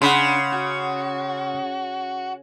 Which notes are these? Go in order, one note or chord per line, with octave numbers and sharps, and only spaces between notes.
C#3 D4 F#5 B5 C6
F#4